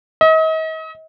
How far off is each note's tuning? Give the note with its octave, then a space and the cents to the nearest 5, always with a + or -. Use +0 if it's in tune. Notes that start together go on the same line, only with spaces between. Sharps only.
D#5 +40